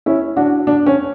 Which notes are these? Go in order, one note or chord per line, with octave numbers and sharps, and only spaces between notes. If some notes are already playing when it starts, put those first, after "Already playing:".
C#4 E4
D4 F#4
D4
C#4